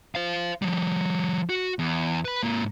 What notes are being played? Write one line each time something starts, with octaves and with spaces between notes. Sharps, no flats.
C5 F5
F3 G3
F#4
E2
B4 B5
G#2 A#3